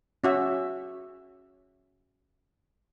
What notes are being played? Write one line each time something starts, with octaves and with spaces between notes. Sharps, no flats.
C#4 F#4 E5